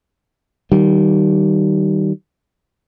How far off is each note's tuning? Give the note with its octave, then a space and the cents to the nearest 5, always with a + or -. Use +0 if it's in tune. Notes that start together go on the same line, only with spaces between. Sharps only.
D#3 +0 G3 -25